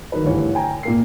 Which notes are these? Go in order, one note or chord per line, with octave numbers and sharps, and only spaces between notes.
D#3 F#3 A#4 B4
D2 G2 E3 C#5
G5 G#5 A#5
A#2 A#3 C7